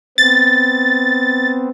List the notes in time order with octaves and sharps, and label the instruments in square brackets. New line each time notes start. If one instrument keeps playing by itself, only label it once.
[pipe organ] B3 C4 [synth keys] A6